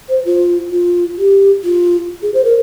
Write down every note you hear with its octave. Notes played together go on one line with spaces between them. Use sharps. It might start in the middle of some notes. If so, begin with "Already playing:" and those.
C5
F4
F4
G4
F4
G#4
C5
A#4